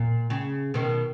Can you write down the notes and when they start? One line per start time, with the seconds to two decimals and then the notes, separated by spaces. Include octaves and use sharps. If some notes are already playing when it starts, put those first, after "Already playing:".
Already playing: A#2
0.30 C#3
0.74 B2 D#3